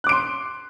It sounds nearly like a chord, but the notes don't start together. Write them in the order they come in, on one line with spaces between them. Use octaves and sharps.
F#6 D6 D7 C6